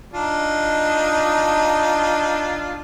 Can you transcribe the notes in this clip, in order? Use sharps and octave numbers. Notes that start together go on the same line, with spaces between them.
D4 D#4 F4